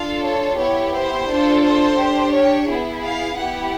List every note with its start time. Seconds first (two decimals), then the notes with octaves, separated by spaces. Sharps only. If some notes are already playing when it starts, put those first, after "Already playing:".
Already playing: D4 F4 A4 F5
0.23 C#5
0.58 B3 E4 G4 C#5
0.94 C5
1.28 D4 F4 A4
1.63 C5
1.97 D4 G4
2.32 C#5
2.67 B3 E4 G#4
3.02 F5
3.37 B3 E4 G4 F#5